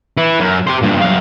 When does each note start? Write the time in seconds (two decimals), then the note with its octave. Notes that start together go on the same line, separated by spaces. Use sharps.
0.17 E4 B4
0.40 F#2
0.67 G4 C5
0.82 G2 A#2
1.01 F#2 F5